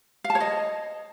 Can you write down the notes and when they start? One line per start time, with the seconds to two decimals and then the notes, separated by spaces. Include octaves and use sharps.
0.24 F5
0.30 A5
0.35 C#5
0.40 D#5